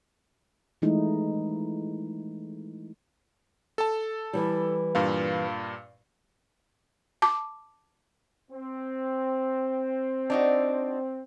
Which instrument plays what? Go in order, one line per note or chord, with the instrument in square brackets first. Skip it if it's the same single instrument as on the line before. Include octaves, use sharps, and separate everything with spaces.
[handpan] E3 G#3 A3 D#4 E4
[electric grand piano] A4 A5
[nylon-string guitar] E3 G3
[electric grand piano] G2 A#2 F5
[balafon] A5 D6
[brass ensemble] C4
[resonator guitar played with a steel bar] D4 D#4 F#4